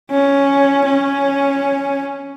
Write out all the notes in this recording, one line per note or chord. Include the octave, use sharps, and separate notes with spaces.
C#4
C#4